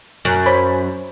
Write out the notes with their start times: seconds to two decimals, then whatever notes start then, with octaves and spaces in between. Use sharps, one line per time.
0.25 F#2
0.46 C5 C#5 B5